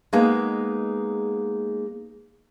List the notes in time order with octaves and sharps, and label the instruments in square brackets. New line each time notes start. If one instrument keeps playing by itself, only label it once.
[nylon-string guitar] G#3 A#3 B3 D#4 G#4